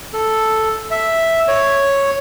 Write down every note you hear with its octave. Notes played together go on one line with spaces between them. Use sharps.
A4
E5
C#5